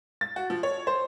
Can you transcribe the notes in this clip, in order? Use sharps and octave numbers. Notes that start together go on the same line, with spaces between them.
A6
F#4
F3
C#5
C5